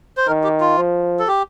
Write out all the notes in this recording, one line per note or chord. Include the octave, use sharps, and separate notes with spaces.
C5
D#3 A#4
G4
F4
F3
A4
G4